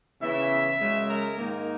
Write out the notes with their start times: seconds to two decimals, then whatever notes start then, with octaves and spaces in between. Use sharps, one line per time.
0.21 C#3 E3 B3 E4 E5
0.80 F#2 C#3 G#3
1.09 A#4
1.38 G#2 D#3 A#3 D#4